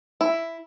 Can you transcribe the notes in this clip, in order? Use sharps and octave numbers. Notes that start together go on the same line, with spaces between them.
E4